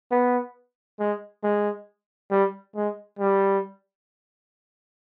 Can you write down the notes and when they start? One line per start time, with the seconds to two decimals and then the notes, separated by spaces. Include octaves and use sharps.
0.11 B3
1.00 G#3
1.44 G#3
2.31 G3
2.76 G#3
3.19 G3